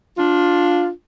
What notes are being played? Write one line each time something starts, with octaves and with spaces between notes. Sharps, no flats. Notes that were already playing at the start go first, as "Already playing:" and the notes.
D4 F4